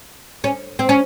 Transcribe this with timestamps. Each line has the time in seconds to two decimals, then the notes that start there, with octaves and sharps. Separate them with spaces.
0.44 C#4
0.79 C4
0.89 C#4